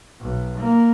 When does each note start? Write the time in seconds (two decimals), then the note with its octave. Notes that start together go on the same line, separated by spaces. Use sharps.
0.21 B1
0.60 A#3